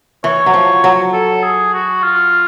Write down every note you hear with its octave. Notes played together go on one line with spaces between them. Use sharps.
E3 C#5
F#3
F3
F#3
A4
G#4
F#4
F4